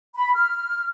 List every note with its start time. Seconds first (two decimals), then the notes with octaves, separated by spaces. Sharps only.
0.16 B5
0.35 F6